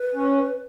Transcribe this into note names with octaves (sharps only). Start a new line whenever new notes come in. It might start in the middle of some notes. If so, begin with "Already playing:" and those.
Already playing: B4
C#4